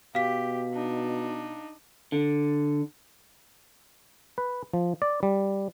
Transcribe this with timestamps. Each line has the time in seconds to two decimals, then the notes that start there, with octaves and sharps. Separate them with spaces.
0.15 B2 G4 F5 B6
0.74 D4 D#4
2.12 D3
4.38 B4
4.74 F3
5.02 D5
5.23 G3